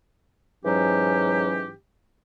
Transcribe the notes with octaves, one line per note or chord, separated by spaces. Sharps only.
G#2 E3 F#3 C#4 G4